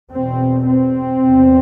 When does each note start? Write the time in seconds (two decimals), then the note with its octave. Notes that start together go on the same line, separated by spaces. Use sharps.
0.13 E2 B2 C4
0.67 C4
1.22 E2 C3